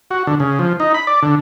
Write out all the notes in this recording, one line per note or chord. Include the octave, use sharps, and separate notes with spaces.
F#4
D3
C#3
F3
D#4
B5
D5
D3